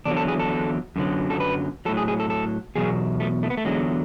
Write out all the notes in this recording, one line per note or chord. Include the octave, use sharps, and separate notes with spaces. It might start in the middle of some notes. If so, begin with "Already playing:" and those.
E2 D3 F#3 D4
A4
G#4
A4
F#2 D3 F#3
A4
B4
A2 F#3 A4
G#4
G#4
A4
A4
E2 B2 F#3 G#4
A3
A3
B3
A3
E2 D3 F#3 G#3